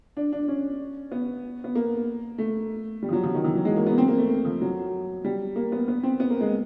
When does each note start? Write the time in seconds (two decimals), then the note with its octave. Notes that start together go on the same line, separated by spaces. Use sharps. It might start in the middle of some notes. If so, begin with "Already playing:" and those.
0.17 D4
0.32 D4
0.48 C#4
1.12 B3
1.64 B3
1.75 A#3
2.38 A3
3.02 G3
3.09 F3
3.13 F#3
3.23 F3
3.34 D#3
3.44 E3
3.55 F#3
3.65 G#3
3.76 A#3
3.86 B3
3.98 C4
4.08 A#3
4.18 A3
4.45 F3
4.61 F#3
5.24 G3
5.56 A#3
5.72 B3
5.88 B3
6.03 C4
6.20 B3
6.30 A#3
6.40 G#3